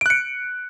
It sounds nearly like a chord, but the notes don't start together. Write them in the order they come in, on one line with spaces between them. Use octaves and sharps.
D7 F#6 C#7